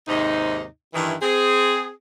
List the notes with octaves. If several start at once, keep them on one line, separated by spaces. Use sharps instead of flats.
D#2 G#2 C3 D#4
G2 D#3 E3
C4 G#4